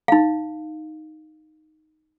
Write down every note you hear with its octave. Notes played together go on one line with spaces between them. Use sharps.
D#4 F5